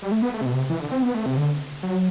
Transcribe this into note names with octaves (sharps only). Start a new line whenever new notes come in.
G3
A3
B3
A3
C3
B2
C3
E3
D3
C4
B3
A3
C3
D3
F#3